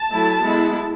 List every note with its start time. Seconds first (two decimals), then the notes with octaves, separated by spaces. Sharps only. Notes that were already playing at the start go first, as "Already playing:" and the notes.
Already playing: A5
0.11 F#3 A3 E4
0.42 G#3 B3 E4